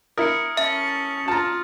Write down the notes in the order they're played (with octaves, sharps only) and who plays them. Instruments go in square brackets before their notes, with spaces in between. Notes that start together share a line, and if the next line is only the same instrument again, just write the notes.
[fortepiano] E4 A#4 [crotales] D#6 C#7
[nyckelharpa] C#4 A5 [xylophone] E5
[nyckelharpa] F4 [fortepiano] A5 A#5